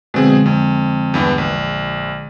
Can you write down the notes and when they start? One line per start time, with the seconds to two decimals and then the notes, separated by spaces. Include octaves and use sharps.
0.14 B2 D3 F3 G#3 C4 G#4
0.46 F2
1.14 E2 G2 E3
1.38 A#1